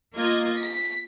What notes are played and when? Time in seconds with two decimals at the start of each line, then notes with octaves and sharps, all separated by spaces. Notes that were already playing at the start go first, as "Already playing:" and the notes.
0.15 A#3 F4 D#5 G#6
0.57 B6